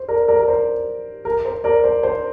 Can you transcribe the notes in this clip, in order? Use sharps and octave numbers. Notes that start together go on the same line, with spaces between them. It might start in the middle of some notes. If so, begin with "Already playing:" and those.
Already playing: C5
A#4 D5
A#4 D5
A#4
C5
A#4
C5
A#4 D5
C5
C5